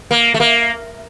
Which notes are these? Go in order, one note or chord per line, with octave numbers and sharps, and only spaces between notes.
A#3
A3
A#3